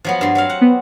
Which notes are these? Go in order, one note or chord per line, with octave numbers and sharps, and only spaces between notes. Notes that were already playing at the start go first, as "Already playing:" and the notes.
F3 F#3 B3
G2 C6
F#3 C4 F5
F#5
B3